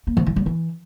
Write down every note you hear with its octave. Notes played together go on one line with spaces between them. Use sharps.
A#3
F3
E3
F#3
E3